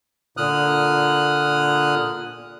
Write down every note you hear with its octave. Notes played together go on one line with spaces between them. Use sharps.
A#2 D3 D#6 F6 F#6